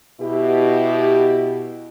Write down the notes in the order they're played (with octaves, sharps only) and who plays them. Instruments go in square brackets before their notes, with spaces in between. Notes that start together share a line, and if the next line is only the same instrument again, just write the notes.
[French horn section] B2 E4 G4